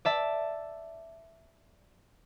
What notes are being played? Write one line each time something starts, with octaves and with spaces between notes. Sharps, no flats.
D5 E5 A5